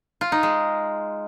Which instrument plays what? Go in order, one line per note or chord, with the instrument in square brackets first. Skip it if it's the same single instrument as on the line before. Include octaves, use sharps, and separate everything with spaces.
[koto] F4
D#4
G#3